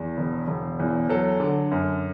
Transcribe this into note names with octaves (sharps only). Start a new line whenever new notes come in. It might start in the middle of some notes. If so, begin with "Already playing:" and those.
Already playing: E2
E1
E1
E2
F#3 A4
D3
F#2